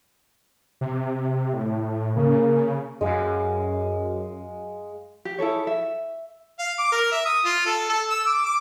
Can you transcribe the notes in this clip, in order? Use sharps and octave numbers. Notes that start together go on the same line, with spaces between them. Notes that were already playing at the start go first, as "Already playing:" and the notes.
C3
A2
C#3 A#3
F#2 G#3 F5
G4
E4 G#4 A4 C#5
E5
F5
D6
A#4
E5
D#6
F4
A4
A4
E6
D6
D6